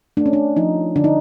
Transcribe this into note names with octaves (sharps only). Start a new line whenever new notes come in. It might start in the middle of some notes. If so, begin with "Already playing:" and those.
A3 D4
C#4
D4
F3 D#4
D3 D4
D#4